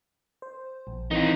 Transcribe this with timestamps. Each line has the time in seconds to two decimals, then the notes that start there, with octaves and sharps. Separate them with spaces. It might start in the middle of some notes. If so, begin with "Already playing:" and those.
0.42 C5
0.87 A#1
1.11 D#3 E3 C4 D#4 F4